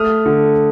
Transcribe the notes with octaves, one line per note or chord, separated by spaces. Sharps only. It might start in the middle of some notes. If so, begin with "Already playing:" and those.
Already playing: A3 D#6 F6
D3